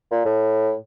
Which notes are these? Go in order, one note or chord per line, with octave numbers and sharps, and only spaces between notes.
A#2
A2